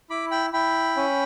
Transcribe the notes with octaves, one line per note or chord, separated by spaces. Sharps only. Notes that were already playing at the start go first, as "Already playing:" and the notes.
E4 B5 D6
G5 B5
E4 G5 B5
C#4